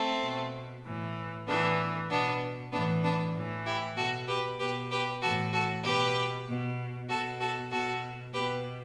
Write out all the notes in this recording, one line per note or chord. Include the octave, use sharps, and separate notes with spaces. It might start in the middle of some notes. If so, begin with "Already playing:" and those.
Already playing: A3 C4
B2
A2 E3
A2 E3 B3 D4
B2 B3 D4
A2 E3 B3 D4
B3 D4
A2 E3
E4 G4
B2 F#4 A4
G4 B4
B2 G4 B4
G4 B4
A2 E3 F#4 A4
F#4 A4
B2 G4 B4
B2
B2 F#4 A4
F#4 A4
B2 F#4 A4
B2 G4 B4